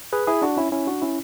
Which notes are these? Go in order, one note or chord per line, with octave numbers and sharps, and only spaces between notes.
G#4 B4
E4 G#4
D4 F#4
C#4 E4
C#4 E4
D4 F#4
C#4 E4